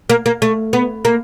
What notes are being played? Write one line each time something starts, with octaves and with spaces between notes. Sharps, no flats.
A#3
A#3
A3
B3
A#3